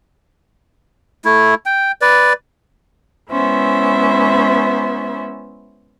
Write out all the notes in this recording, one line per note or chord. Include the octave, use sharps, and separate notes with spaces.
A3 E4
G5
B4 D5
G#3 B3 C#4 E4 C5 E5